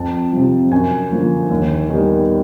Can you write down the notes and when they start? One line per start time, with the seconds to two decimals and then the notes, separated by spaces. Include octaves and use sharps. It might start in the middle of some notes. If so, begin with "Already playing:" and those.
Already playing: F2 A5
0.33 C3 F3
0.71 F#2 G#5
1.11 D3 F3 A#3
1.51 D#2
1.90 D#3 G3 B3